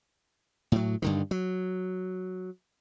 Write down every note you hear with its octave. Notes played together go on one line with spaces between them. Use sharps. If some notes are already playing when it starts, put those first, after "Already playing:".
A2 F#3
G2 D3 D#3
F#3